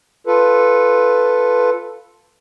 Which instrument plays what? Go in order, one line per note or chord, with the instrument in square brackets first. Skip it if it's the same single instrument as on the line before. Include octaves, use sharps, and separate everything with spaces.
[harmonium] F4 A4 B4